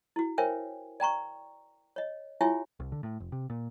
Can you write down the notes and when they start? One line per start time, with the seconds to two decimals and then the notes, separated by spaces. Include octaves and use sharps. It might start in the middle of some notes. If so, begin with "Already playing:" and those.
0.16 E4 F#4
0.38 A#4 C5 C#5 E5 G5 G#5
1.00 D5 G5 A#5 C#6
1.96 C#5 D#5
2.41 E4 F4 G4 C#5 E5 G#5
2.80 C2
2.92 D3
3.03 A2
3.20 F1
3.32 C3
3.50 A#2